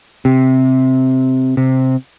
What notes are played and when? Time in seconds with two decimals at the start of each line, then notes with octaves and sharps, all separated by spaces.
0.25 C3
1.57 C3